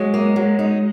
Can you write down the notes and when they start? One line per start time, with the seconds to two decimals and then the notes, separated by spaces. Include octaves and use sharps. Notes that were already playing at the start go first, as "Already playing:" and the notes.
Already playing: F#3 G#3
0.14 A#3
0.36 F#3
0.59 D#4